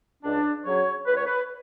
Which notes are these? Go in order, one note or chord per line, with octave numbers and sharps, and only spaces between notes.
C#2 D4
C#3 F#3 C#5
C#2 B4
C#5
B4